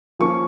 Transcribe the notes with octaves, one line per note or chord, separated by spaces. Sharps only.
F3 A#3 C#4 C#6